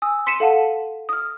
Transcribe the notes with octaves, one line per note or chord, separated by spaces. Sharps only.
G#5 D#6 E6
C6 B6 C#7 D#7 E7
A4 F5 F#5 A5 D#7
D#6 F6